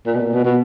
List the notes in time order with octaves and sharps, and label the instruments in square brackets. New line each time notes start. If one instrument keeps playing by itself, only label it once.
[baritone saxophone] A#2
B2
A#2
B2
B2